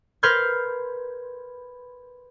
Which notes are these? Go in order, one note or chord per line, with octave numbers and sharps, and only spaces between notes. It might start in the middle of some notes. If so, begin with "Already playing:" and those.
A#4 B4 C6 F6 G6 G#6